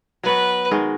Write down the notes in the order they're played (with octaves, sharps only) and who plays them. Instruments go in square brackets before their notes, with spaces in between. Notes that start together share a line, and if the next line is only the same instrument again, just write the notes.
[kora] F#3 B3 F#4 [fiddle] B4
[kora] D#3 G#3 D#4 F#4